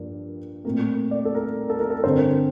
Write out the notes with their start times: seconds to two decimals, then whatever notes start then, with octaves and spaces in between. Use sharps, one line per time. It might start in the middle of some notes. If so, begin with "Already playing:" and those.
Already playing: G2 F3 A#3 D4
0.64 A#2 A3 C4 A#4
1.11 D5
1.25 A4
1.35 A#4
1.70 A4
1.80 A#4
1.90 A4
2.04 G2 D3 G3 C4 C5